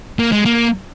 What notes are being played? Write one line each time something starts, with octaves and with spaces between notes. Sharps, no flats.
A#3
G#3
A#3